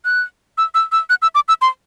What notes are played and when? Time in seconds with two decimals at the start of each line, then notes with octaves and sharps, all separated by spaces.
0.05 F#6
0.58 E6
0.75 E6
0.92 E6
1.10 F#6
1.22 E6
1.35 D6
1.48 E6
1.62 C6